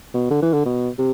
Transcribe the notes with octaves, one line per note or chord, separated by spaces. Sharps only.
B2
D3
E3
D3
B2
C3